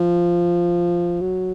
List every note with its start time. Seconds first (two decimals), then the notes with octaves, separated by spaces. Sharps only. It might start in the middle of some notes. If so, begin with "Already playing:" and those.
Already playing: F3
1.21 F#3